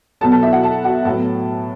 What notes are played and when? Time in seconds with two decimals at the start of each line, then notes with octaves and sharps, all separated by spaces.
0.21 B2 F#3 B3 A4 A5
0.31 A4 A5
0.42 E4 E5
0.52 F#4 F#5
0.63 A4 A5
0.84 F#4 F#5
1.05 A2 F#3 B3 A4 A5